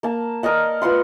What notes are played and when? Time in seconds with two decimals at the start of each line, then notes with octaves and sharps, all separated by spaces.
0.03 A#3 A5
0.43 A#4 D5 D#5 F#5
0.82 F4 B4 F#5 C6